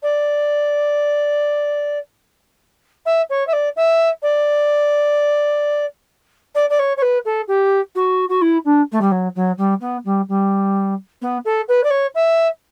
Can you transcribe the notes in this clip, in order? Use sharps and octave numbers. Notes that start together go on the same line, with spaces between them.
D5
E5
C#5
E5
D5
E5
D5
D5
D5
C#5
C#5
B4
A4
G4
F#4
F#4
E4
D4
A3
G3
F#3
F#3
G3
B3
G3
G3
B3
A4
B4
D5
C#5
E5